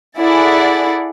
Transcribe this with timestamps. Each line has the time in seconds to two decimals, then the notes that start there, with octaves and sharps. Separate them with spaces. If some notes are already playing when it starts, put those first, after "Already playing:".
0.20 E4 G#4 A4 D5 F#5 A6